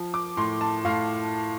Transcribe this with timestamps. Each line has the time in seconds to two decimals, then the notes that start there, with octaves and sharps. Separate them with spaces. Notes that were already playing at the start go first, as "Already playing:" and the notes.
Already playing: F3
0.14 D6
0.37 A2 C6
0.61 A5
0.85 A2 F5